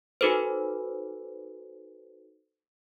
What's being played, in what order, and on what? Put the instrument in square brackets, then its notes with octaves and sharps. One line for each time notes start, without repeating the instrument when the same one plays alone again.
[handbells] D#4 F#4 A4 B4 C5